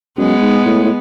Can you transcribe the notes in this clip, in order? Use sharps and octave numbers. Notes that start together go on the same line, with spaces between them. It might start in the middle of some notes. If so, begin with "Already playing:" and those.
F#2 G#3 B3
G#2
A2
A2